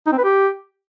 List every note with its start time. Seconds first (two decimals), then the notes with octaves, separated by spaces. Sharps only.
0.07 D#4
0.12 C4
0.18 B4
0.24 G4